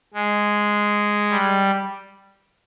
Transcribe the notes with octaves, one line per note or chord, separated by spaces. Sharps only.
G#3
G3